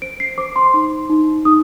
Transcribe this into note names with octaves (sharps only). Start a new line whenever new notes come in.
C5 D7
C7
C5 D6
C6
D#4
D#4
D#4 D#6